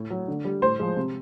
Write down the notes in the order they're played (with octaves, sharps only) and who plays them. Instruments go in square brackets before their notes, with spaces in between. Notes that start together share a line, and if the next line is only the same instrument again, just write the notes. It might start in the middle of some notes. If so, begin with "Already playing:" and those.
Already playing: [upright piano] A2
F#3
D3
G3
A2 C5
F3 G#3
C3